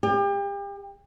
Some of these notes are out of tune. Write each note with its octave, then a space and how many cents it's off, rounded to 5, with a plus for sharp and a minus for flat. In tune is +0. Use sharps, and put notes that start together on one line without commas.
G4 +35